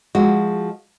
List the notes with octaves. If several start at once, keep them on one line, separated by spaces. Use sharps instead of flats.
F3 G#3 F#4